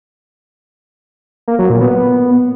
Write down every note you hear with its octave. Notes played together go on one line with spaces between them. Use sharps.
A#3
F#3
A#2
B3